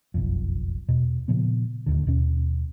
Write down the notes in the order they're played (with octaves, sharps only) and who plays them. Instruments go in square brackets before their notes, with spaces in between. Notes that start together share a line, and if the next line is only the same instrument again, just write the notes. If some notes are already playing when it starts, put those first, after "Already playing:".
[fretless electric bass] F#1 B1 F2
E2 B2
A#2 C#3 F3 B3
D1 G#1 D#2 D3
D#2 B2 C#4